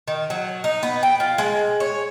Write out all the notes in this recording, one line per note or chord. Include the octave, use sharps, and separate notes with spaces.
D#3
F#3
D#4
B3
G5
F4
G#3
C#5